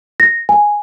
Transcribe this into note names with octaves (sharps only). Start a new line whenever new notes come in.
A#6
G#5